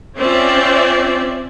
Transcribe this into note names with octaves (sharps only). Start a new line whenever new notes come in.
C4 C#4 F4 D5 E5